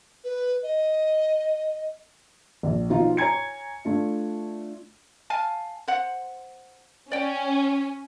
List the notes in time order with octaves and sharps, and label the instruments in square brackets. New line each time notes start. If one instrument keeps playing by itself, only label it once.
[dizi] B4
D#5
[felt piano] A#1
B2 F3 D#4 F4
C#5 G#5 A#5 G#6 C#7
A3 D4 F4
[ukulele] F5 G#5 A5
C5 F#5
[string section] C#4 [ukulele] D5 G5